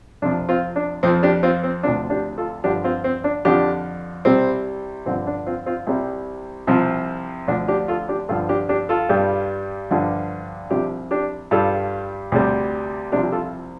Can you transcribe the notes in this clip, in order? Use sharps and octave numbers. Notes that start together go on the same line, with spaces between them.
F2 C3 F3 D4
C4 F4
D4
F2 F3 C4
D4 G4
C4 F4
C4
D2 C3 F3 D4
D4 G4
F4 A4
G2 D3 F3 D4 G4
C4 F4
C4
D4
F2 D3 F3 D4 G4
C2 C3 G3 C4
G2 D3 F3 C4
D4
C4 F4
C4 F4
C2 C3 G3
C2 C3 F3
D2 D3 F3 D4
D4 G4
F4 A4
D4 G4
G2 D3 F3 F4 A4
D4 G4
D4 G4
F4 A4
G2 G3
G2 D3 F3
C2 C3 F3 D4 G4
D4 G4
G2 G3 F4 A4
D2 C3 G3
C2 C3 F3 D4 G4
G4
F4 A4